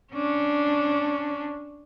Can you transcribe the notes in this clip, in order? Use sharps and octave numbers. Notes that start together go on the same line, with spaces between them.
C#4 D4